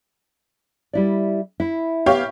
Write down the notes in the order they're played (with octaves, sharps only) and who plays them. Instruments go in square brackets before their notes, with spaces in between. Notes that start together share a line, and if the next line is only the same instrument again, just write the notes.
[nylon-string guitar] G3 E4 D5
E4
[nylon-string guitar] B3 [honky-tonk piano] G4 C#5 F5